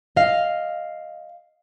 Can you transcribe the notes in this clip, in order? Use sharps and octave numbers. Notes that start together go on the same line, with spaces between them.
D#5 F5